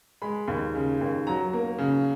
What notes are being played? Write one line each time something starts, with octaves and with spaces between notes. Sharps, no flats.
G#3 B5
D#2
C#3
D#2
F#3 A#5
A#3
C#3